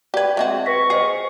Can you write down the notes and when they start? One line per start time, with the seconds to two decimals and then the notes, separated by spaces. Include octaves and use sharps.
0.14 G4 B4 D5 G#6
0.37 G#3 C4 F#4 E5
0.66 B4 C#6 A#6 B6
0.90 G#4 C5 D#5 C7